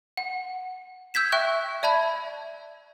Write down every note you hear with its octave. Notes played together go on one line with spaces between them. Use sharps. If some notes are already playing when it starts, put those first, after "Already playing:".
F#5
E6 G6 G#6 B6 E7
E5 G5 C#6 F#6
D5 E5 A5 B5 G#6